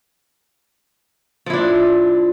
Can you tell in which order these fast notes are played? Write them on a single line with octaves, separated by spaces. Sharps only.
F3 E4 D4